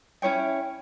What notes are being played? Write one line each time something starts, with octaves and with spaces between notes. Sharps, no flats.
C#4 E4 C#5 G5